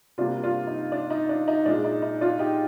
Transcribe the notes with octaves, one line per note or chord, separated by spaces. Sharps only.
C3 G3 A#3 D4 F4
D4 F4
D#4
D4
D#4
D4
D#4
A#2 G#3 D4
D#4
D#4
D4 F4
D#4 G4